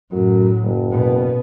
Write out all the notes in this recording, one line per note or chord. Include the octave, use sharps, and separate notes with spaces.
F#2 A2 F#3
F#1
B2 B3